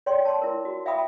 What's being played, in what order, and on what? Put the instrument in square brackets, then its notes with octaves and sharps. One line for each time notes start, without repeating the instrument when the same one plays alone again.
[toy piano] C#5 D5 G5 C6
A5 C6
E4 A#4
F#4
E5 F5 G5 B5 D#6